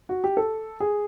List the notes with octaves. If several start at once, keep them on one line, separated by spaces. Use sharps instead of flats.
F#4
G4
A4
G#4